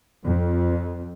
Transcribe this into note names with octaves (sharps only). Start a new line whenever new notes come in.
F2